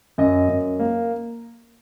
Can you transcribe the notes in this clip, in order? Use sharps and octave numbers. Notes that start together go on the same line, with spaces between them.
F#2 D#5
F#2
A#3